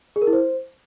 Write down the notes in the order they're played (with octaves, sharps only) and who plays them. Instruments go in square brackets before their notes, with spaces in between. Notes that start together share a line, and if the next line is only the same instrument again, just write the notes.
[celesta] G#4
A#4
E4
C5